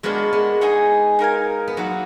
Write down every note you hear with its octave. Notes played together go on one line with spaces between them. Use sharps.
G#3 A#3 B3 D4 F#4 B4
G#3 B3
D#4 G#4 D#5 G#5
D#4 A#4 F5 G#5
B3
F#3 A#3 D#4 F#4 B4